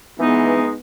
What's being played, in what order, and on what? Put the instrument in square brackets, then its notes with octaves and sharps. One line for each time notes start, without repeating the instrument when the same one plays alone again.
[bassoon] E3 [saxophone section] G#3 D#4 [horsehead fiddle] B3